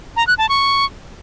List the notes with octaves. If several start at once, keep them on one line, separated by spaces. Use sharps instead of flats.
A#5
F#6
A5
C#6